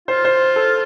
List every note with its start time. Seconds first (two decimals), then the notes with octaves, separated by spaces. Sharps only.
0.08 F4 C5
0.25 C5
0.56 A4